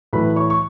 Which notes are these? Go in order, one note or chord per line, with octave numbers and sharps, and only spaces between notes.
A2 E3 B4 B5
C#5 C#6
C#6